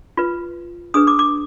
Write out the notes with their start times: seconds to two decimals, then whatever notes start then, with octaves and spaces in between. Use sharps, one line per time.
0.17 F4 B4
0.94 D4 G#4 B4 D#6
1.07 D6
1.19 D6